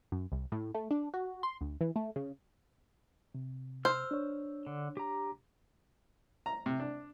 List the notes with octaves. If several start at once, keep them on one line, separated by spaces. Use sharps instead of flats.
F#2
C2
A2
A3
D4
F#4
C6
D2
E3
A3
C#3
C3
C5 E6 F6 G6
D4 C#5
D3
G4 A#5
A#5
C3
D4